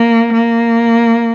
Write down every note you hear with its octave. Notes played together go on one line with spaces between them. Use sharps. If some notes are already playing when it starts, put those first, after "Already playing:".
Already playing: A#3
A#3